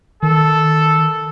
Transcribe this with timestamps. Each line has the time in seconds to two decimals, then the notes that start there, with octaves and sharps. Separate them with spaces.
0.23 D#3 A4